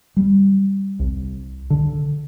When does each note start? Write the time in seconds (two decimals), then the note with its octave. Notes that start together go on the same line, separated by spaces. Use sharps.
0.16 G3
0.99 C2
1.70 D3